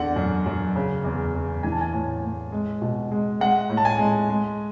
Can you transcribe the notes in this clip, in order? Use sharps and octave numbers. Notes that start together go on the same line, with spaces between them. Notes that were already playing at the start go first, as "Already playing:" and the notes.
Already playing: E2 D3 F#5
F#2
F#2
C#3
E2
E2
E3 G#5
A5
G#5
A2
A2
G#3
B2
G#3
G#3 F#5
A2
A5
G#5
G#3
G#3